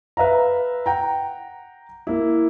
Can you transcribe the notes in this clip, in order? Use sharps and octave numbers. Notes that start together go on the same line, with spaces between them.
B4 E5 F5 A#5
F#5 G5 A#5
A#3 E4